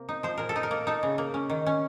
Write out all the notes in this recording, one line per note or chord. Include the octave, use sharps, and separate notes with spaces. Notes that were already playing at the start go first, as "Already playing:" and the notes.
Already playing: C3 A#3
D#4
F3 C5
A#2 A#4
A4
D#4
A#4
A#3
D#4 A4
C#3
A#3
C#4
D#3
C#4